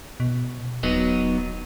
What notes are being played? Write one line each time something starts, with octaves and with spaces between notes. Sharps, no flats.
B2
D#1 F#3 B3 D#4